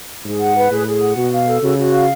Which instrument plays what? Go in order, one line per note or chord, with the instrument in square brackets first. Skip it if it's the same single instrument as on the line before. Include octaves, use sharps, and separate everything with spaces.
[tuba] G#2 [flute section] G#4
[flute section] F#5
B4
[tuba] A2 [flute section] G#4
[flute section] G#4
F#5
[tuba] B2 [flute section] F#4
[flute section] F5
A4
[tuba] C#3 [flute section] F#4
[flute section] F#4
F5